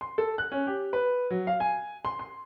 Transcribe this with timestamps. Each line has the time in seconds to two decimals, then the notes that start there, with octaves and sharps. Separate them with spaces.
0.01 C6
0.18 A4
0.38 F#6
0.52 C#4
0.67 G4
0.93 B4
1.30 F#3
1.47 F5
1.60 G#5
2.05 C6
2.19 C6